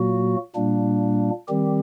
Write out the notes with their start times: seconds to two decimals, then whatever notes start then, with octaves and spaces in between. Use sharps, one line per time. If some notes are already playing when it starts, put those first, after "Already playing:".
Already playing: A#2 F#3 A#3 F#4
0.55 A#2 G3 A#3 D4
1.48 D#3 G3 C4 G4